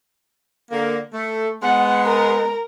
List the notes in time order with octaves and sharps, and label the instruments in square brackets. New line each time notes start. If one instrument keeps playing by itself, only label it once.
[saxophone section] D3 A#3
A3
[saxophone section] G#3 B3 [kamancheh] F#5
[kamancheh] A#4 A#5